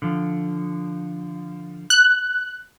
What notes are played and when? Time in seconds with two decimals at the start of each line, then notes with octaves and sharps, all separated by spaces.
0.02 D3 F3
1.90 F#6